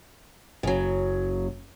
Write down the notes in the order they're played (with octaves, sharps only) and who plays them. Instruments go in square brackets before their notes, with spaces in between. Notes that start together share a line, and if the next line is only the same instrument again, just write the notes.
[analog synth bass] F#1 [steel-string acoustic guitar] C#3 F#3